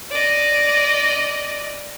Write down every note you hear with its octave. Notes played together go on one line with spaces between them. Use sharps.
D5 D#5